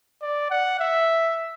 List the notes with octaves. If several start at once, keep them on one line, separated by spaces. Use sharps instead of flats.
D5
F#5
E5